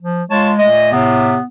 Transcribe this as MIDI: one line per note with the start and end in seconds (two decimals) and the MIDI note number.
0.02 0.23 53
0.30 0.68 56
0.30 0.51 65
0.30 0.51 73
0.30 0.51 81
0.59 0.89 46
0.59 0.89 57
0.59 0.89 75
0.92 1.36 45
0.92 1.36 48
0.92 1.46 59